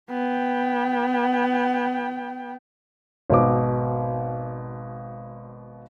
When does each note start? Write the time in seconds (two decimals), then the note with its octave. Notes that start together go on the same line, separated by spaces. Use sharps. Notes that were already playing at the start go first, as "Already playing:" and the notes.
0.10 B3 G5
3.30 G#1 B2 D6